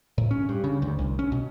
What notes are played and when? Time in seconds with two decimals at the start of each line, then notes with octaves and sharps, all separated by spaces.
0.18 A2
0.31 C#4
0.49 G2
0.64 C#3
0.82 D2
0.99 C2
1.19 C#4
1.32 B2